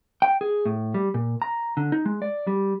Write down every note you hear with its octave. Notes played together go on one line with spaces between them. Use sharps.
G5
G#4
A2
G3
A#2
A#5
D3
D#4
G#3
D5
G3